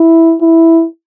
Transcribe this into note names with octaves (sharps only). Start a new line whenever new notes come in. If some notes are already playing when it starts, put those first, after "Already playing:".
Already playing: E4
E4